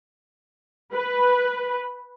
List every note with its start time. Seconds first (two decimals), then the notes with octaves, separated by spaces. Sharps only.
0.93 B4